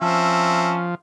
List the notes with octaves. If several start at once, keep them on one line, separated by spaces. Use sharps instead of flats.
F3 C4 C#4 E5 A5